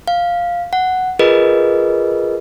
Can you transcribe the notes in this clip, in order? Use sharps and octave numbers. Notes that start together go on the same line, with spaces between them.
F5
F#5
F4 G#4 A#4 B4 D#5